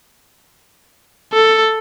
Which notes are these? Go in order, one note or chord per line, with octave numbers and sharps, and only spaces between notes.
A4